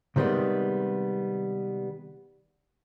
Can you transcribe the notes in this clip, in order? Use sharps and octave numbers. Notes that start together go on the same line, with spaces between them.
C3 D#3 G3 G#3 B3